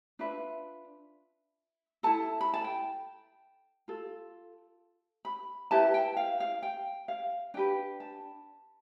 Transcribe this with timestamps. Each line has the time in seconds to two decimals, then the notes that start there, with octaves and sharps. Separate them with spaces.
0.19 D4 F4 B4 E5
2.03 E4 A4 A5
2.41 B5
2.54 A5
2.64 G5
3.88 F4 A4
5.25 B5
5.71 E4 G4 B4 A5
5.94 G5
6.17 F5
6.40 F5
6.63 G5
7.08 F5
7.54 D4 G4 B4 G5
8.00 A5